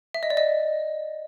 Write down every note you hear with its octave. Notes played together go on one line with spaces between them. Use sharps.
E5
D#5
D5
D#5